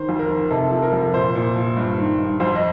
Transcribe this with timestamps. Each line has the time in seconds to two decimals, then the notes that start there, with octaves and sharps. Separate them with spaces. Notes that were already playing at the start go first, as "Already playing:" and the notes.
Already playing: D#3 C5
0.09 F2
0.19 A#4
0.30 D#3
0.50 C3 A4
0.71 F3
0.77 A4
0.82 A#4
0.93 F2
1.14 A#2 C5
1.35 A#2
1.56 F3
1.77 G2
1.98 D#3
2.19 G2
2.40 F2 C5
2.55 D#5